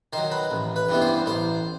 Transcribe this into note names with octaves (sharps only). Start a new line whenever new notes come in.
D#3 F#3 C5
B4
A1
B4
G2 E3 G3 B3
C5
A1 C5